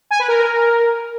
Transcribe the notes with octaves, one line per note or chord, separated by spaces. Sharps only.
G#5
B4
A#4